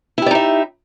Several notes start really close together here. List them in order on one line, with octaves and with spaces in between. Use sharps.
E4 G4 D5 D#4 E5